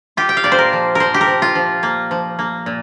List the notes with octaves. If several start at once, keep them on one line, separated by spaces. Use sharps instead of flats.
F4 G4
G5
F5
A#2 D5
C5
A#4
F3
F3 A#4 C5
G4
A#4
F3
F4
F3
A#3
F3
A#3
A#2